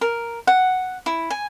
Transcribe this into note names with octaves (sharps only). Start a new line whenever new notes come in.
A#4
F#5
E4
G#5